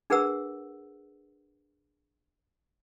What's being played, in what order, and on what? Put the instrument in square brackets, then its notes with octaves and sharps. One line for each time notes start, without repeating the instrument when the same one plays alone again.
[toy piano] D4 G#4 A#4 B4 F#5 E6